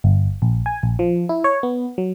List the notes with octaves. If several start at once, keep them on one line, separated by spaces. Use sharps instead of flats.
G1
A#1
G#5
A#1
F3
E4
C#5
B3
F#3